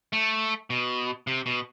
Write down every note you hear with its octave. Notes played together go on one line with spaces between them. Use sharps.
A3
B2
C3
B2